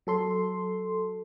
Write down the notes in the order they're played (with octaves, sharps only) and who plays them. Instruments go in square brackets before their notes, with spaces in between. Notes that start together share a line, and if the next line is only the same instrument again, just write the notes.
[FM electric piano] F#3 A4 C6